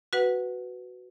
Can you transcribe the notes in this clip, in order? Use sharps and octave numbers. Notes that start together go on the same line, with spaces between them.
F#4 B4 F#5